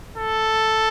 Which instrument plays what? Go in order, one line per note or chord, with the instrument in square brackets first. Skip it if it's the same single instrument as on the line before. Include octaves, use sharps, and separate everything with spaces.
[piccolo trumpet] A4